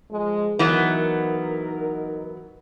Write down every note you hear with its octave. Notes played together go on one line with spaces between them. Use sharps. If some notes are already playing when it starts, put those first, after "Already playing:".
F3 G#3
E3 F#3 B3 D#4 A#4